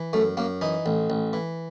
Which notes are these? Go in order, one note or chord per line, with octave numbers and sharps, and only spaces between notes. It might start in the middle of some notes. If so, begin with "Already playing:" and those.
Already playing: E3
F#2 A3
F#2 A#3
E3 D#4
A1
A1
E3